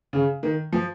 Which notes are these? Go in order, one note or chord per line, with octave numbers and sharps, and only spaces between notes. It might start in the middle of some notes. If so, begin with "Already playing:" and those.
C#3
D#3
F3